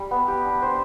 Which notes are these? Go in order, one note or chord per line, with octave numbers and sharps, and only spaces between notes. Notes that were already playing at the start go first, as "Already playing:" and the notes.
Already playing: G3
B3
G4
D4
C5